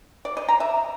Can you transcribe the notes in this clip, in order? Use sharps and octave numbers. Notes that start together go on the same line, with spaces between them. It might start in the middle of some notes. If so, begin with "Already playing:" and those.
D5
D#5
A#5
E5